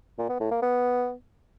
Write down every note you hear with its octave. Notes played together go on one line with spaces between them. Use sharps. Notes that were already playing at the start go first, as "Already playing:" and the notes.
A#2
B3
A2
A#3
B3